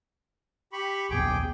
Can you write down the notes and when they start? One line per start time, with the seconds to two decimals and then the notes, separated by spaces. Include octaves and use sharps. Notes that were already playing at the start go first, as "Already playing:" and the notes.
0.73 G4 B5 C#6
1.11 D#1 A#1 B3 G#4 G5 D6